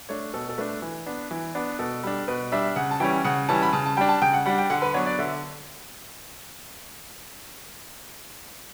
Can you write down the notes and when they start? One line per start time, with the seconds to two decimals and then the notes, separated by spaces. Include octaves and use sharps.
0.09 A3 D4 C#5
0.34 B2 A4
0.49 A4
0.58 A3 D4 B4
0.82 E3
1.06 B3 D4
1.31 E3
1.55 B3 D4
1.79 B2 A4
2.03 G3 D4
2.28 B2 B4
2.52 G3 D4 E5
2.76 C#3 F#5
2.91 A5
3.00 E3 G3 C#4 G5
3.24 C#3 F#5
3.49 E3 G3 C#4 A5
3.63 B5
3.73 C#3 A5
3.86 A5
3.97 G3 D4 G5
4.09 A5
4.22 C#3 G5
4.33 F#5
4.46 G3 D4 F#5
4.58 G5
4.70 D3 F#5
4.82 B4
4.94 F#3 B3 D4 C#5
5.06 D5
5.19 D3 E5